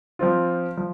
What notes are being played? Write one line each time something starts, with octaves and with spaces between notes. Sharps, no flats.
F3 C4 F4
F3